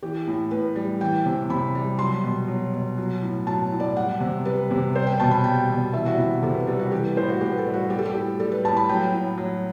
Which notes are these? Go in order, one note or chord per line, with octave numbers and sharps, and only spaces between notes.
E3 G4
A2
A2 B4
G3
E3 G5
C3
C3 B5
G3
F#3 C6
B2
F#3
B2
F#3
A2
F#3 A5
A2
D5
G3 F#5
C3
G3 B4
C3
G3 C5
G5
B2 A5
B5
G3 G5
B2
E3 E5
F#4
C3 E4
C3 A4
B4
G3 B4
F#4
E3 G4
B4
A2 C5
F#4
A2 G4
B4
A4
G3
F#4
G3 G4
A4
G4
A2
G3 A4
B4
A2 A5
B5
F#3 G5
A2
F#3